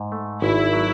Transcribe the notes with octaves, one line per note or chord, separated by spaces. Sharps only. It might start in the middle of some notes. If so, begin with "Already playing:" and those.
Already playing: G#2
A3
G#1 E4
F#3